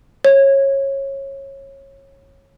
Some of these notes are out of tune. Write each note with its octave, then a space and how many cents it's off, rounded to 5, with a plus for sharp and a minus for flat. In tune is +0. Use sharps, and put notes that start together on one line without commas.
C#5 -20